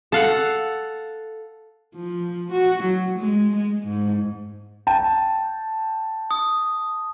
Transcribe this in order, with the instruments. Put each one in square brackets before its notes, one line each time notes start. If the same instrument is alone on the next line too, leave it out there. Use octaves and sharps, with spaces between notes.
[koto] A4 F5 F#5
[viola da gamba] F3
F#4
F#3
G#3
G#3
G#2
[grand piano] G5 A5
[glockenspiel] D#6